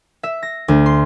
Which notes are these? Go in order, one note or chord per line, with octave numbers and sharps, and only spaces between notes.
E5
A#6
D2
C6